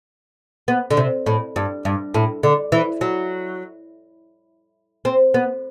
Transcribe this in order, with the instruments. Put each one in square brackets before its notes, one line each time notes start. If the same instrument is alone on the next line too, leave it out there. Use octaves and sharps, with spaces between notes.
[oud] B3
D3
C3
A2
G2
G2
A2
D3
E3
F#3
C4
B3